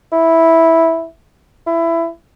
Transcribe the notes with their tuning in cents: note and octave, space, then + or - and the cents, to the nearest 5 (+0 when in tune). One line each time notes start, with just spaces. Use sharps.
E4 -5
E4 +20